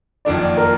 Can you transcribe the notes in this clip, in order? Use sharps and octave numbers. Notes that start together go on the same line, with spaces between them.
F#1 F2 D#3 A#3 D4 D5
A#4